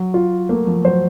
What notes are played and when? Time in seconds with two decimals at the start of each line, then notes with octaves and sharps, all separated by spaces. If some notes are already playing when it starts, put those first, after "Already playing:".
Already playing: F#3
0.14 F4
0.49 A3 A#3
0.67 F3
0.84 F#3 C5